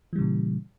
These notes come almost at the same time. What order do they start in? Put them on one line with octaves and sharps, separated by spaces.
E3 G3 C#3 A#2